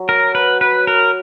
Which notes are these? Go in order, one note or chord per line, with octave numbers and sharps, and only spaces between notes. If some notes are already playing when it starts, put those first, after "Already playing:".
Already playing: F#3
A#4
B4
B4
A#4